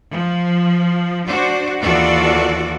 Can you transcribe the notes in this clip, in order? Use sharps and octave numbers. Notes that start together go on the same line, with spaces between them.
F3
D4 F#4 C5
D#2 E3 F4 F#4 A4 D5